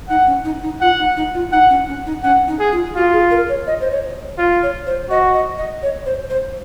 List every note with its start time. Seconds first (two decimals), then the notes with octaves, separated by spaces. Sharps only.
0.09 D#4 F#5
0.27 C#4
0.45 D#4
0.63 D#4
0.81 F4 F#5
0.99 D#4
1.17 D#4
1.35 F4
1.52 D#4 F#5
1.70 C#4
1.89 C#4
2.06 D#4
2.24 C#4 F#5
2.48 D#4
2.60 G#4
2.72 F4
2.96 F4 F#4
3.13 G#4
3.31 A#4
3.49 C#5
3.67 D#5
3.81 C5
3.91 C#5
4.38 F4
4.63 C#5
4.87 C5
5.10 F#4 D#5
5.34 D#5
5.58 D#5
5.83 C#5
6.06 C5
6.30 C5